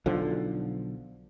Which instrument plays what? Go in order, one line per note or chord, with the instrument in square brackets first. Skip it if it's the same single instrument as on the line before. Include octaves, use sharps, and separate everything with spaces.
[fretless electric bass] B1 D3 F3